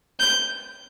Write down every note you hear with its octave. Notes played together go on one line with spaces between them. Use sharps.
G6